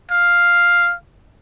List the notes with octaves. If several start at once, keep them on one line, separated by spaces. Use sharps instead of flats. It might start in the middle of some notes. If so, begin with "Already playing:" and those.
F5